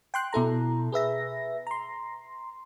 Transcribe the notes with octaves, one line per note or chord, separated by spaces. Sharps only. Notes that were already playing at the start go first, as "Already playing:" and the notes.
G5 C6 F#6
B2 E4 A4 A#5
G#4 B4 E5 A#6
A#5 C6